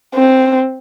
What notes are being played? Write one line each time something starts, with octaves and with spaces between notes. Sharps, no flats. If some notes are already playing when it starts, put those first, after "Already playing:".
C4